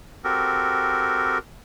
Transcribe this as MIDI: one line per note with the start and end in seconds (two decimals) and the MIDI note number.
0.24 1.38 60
0.24 1.38 66
0.24 1.38 67
0.24 1.38 69
0.24 1.38 70